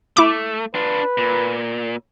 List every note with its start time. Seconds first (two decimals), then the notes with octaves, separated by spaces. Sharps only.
0.17 A3 E4 D6
0.75 D4 F4 B4
1.18 A#2